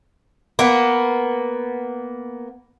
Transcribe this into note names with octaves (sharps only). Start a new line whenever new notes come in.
A#3 B3